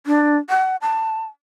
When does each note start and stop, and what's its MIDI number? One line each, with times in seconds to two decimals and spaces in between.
0.06 0.38 62
0.50 0.76 78
0.82 1.24 81